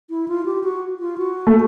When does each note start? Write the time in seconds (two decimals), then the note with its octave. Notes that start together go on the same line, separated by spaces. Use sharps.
0.10 E4
0.28 F4
0.46 G4
0.64 F#4
1.00 F4
1.18 F#4
1.47 A3